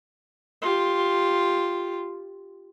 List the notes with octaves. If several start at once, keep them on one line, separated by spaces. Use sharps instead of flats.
F4 G4